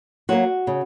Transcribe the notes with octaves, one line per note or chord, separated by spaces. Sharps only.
F#3 A#3 F#4
C#3